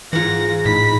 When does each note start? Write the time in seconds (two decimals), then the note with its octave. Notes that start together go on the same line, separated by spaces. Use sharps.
0.13 G#2 E3 F4 F#5 A#6
0.66 A2 D#4 B5 B6